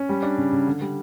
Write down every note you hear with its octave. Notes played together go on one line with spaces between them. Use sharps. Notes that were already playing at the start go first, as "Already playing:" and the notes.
Already playing: C#4
G3
D4
C#3
C#3
D3
G3